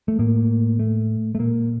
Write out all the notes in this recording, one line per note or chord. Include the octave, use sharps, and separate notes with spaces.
A3
A2 A#3
A3
A3
A#2 A#3